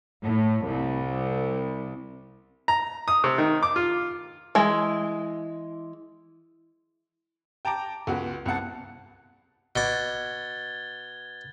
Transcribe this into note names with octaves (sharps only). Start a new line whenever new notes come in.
A2
C2
A#5
D#6
C3
D#3
D6
F4
E3 G#3
G5 A5 A#5 D6 D7
C#2 B3 F#4
C2 C3 F#5 A5
B2 D6 G#6 A6 G7